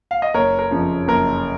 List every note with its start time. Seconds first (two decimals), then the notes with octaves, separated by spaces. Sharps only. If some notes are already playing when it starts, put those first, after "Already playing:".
0.11 F5
0.22 D#5
0.34 F#1 A#4 C#5
0.59 A#4
0.71 F2 C#3 F3
1.08 F#1 A#4